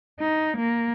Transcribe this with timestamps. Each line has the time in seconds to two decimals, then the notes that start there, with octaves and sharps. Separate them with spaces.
0.20 D#4
0.57 A#3